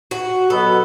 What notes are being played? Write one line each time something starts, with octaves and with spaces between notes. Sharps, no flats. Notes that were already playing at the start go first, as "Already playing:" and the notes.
F#4
B2 F#3 B3 A4